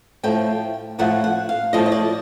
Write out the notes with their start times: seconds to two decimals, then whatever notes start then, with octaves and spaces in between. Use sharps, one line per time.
0.23 A2 F3 A3 G5
0.99 A2 F3 A3 F#5
1.24 F#5
1.49 F5
1.73 A2 F3 A3 D#5
1.86 D#5
1.92 D5